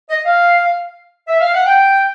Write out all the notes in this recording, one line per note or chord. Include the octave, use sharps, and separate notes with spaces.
D#5
F5
E5
F5
F#5
G5